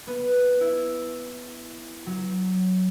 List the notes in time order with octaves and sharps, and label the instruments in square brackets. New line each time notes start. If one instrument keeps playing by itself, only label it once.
[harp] B3
E4
F#3